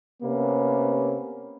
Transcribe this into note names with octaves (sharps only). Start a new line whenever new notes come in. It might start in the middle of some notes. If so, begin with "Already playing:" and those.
C3 A#3 B3 C#4